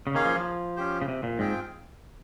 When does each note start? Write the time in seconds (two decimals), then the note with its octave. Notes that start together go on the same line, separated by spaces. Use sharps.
0.07 C#3
0.14 D#3 A#3 C#4 G#4 C#5 F5
0.25 F3
0.36 F3
0.76 C#4 G4 C5
1.02 C#3
1.08 C3
1.23 A#2
1.39 G#2 C4 F4 G#4 C5 G5